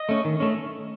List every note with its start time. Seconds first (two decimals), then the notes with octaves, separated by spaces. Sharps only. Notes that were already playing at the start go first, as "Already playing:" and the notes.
Already playing: D#5
0.09 A3 C#4
0.25 D#3
0.40 A3 C#4